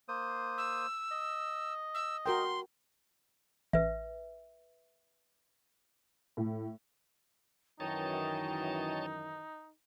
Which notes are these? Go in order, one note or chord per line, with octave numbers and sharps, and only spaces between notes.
A#3 C5 D#6
E6
D#5
E6
F#4 A#4 G5 C6
A1 B4 E5
A2
F#2 D#3 E3 D#4 C#5 D#5 G5 A5